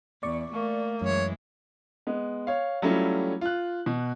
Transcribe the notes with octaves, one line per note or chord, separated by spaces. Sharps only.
E2 D5 C#6
A3 A#3
F#2 E3 G#3 C#5
G#3 B3
C#5 F5
F#3 G3 A3 C#4 E4 F4
F4 F#6
B2